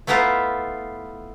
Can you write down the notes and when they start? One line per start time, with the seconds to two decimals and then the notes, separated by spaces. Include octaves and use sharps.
0.07 A3 B3 E4 F4 A#5